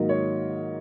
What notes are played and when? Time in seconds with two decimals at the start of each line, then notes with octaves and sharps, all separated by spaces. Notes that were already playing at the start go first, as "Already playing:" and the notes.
Already playing: G#2 D#3 F#3 A#3
0.09 C#5